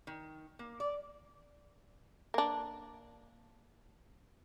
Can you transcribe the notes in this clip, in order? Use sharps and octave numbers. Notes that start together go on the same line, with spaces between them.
D#3
A#3
D5
A#3 D4